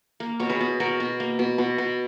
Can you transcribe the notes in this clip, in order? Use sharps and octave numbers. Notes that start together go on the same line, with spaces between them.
A#3
B2 C#5
G#4 B4
B2
B2 F#4 A#4
B2
A#3
B2
B2
B2